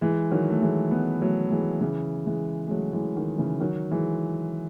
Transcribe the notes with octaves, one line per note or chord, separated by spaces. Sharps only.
E3 G#3
D#3 F#3
A3
E3 G#3
G#3 B3
F#3 A3
E3 G#3
C#3 E3
E3 G#3
G#3
F#3 A3
E3 G#3
D#3
C#3 E3
D#3 F#3
E3 G#3